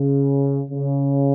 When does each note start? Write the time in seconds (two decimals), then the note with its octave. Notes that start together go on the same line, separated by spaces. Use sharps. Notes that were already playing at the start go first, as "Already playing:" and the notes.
Already playing: C#3
0.70 C#3